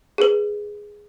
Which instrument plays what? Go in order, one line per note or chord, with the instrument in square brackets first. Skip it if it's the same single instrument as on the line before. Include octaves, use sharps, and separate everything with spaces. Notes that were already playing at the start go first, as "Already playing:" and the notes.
[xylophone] G#4 B4